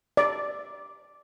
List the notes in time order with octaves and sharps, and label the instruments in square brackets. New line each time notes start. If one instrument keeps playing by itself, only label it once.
[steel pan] D5